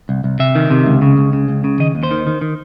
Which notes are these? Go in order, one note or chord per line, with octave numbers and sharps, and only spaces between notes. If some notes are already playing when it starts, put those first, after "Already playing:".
C2
C2
C3 E5
D#3
C3
C#2
C#3
C#2
C#3
C#2
C#3
D#3 D#5
D#2
C5
D#3
D#3
D#3